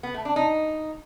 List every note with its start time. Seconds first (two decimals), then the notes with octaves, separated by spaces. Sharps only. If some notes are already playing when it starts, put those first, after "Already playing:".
0.03 B3
0.14 A3
0.25 D4
0.36 D#4